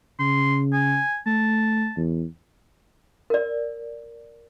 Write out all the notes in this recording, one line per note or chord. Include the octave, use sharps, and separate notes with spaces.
C#3 C6
G#5
A3 A5
E2
A#4 D5